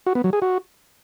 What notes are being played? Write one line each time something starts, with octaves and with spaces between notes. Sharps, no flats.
F#4
B3
F#3
G#4
F#4